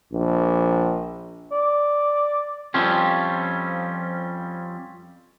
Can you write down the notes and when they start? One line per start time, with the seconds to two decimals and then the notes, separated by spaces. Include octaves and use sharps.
0.13 A#1
1.52 D5
2.74 F2 F3 G3 C4 C#4